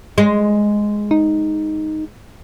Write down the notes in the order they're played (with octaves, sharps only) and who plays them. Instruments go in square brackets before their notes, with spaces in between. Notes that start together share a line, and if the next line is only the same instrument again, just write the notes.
[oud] G#3
[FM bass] D#4